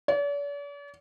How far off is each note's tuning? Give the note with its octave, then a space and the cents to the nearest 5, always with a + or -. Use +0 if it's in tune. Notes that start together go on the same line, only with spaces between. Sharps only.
D5 -45